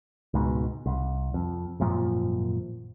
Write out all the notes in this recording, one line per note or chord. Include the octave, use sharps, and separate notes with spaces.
C#2 G#2 B2
C2
F2
G#1 F#2 A#2 F3